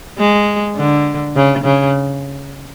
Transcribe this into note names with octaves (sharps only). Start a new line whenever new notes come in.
G#3
D3
C#3
C#3